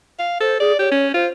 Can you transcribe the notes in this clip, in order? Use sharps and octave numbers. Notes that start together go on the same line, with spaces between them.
F5
A4 C5
G#4 D5
G4 C#5
C#4
F4 C5